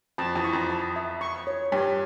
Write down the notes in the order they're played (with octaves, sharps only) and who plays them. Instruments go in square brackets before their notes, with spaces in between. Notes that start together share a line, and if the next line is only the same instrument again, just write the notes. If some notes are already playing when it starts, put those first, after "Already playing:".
[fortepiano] F2 [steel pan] A5
[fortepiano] E2
[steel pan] C#6
[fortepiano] F2
[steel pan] A5
E5
C#6
C#5
[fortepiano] G2 [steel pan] C#5